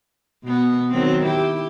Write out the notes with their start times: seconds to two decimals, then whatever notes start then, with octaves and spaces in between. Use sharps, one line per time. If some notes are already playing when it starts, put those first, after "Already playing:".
0.44 B2 B3
0.90 D#3 F#3 C4
1.24 E4 G4